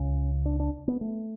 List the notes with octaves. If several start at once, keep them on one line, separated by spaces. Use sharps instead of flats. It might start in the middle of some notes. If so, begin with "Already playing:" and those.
Already playing: C#2 C#3 C#4
D4
D4
B3
A3